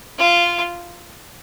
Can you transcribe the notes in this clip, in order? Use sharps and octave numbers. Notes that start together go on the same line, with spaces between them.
F4